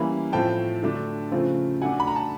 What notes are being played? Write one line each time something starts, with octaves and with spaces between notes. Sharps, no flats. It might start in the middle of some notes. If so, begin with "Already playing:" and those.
Already playing: E3 G3 A#3 C#4 E4 B5
A2 F3 A3 C4 E4 G5 A5
D3 F#3 A3 D4
C#3 F3 A3 C4 F4
F#3 A3 D4 F#5 G#5
B5
A#5
A5